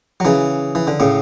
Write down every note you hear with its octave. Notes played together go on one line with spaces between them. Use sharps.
F#3
C#3 E3
E3
D3
A2 C#3